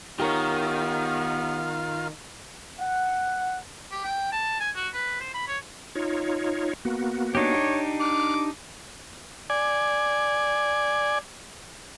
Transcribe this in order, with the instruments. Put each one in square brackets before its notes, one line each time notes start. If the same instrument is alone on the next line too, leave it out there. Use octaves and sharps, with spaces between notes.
[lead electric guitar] D#3 [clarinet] B3 [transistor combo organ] F4 [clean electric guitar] G4 A#4 C#5
[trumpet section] F#5
[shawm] G4
G5
A5
G#5
F#4
B4
C5
B5
C#5
[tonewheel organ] D#4 F4 C#5
A#3 B3 F#4
[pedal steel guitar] D4 D#4 G4 [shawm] C#5
[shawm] D6 [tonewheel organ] F6 F#6
[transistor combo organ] D5 G#5